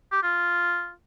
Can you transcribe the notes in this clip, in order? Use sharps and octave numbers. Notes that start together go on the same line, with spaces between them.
G4
F4